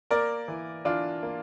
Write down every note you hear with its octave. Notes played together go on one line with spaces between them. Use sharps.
A#3 A#4 D5
E3
E3 D4 F4
A#3